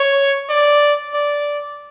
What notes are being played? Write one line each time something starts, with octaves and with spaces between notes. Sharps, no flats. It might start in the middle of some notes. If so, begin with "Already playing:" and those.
Already playing: C#5
D5
D5